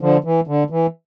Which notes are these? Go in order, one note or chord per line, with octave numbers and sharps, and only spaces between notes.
D3 F3
E3
D3
E3